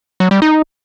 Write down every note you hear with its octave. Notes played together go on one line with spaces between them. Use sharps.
F#3
G3
D#4